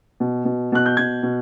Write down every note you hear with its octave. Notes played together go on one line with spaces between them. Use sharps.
B2
B2
B2 F#6
G6
B2 G#6
B2